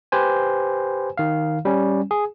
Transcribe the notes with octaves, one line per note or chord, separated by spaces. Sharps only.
G4 B4 C5 G#5
D#3 F5
G3 C#4
G#4